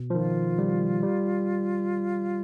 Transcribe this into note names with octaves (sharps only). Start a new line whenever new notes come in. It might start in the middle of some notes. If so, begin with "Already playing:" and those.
Already playing: B2
F3
D#3 F4
G3
G3